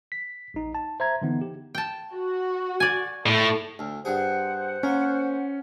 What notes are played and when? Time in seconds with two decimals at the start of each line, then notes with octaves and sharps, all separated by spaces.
0.12 B6
0.54 A#1 D#4
0.75 A5
1.00 C5 E5 A#5 G#6
1.22 D3 E3 B3 D#4
1.42 G4
1.75 G5 A5
2.15 F#4
2.80 D5 G#5
3.26 A2 A4
3.79 D2
4.05 G2 G#4 C5 F#5
4.83 A#3 C#4